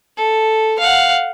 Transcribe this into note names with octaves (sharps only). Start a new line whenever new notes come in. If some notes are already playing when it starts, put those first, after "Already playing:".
A4
F5 F#5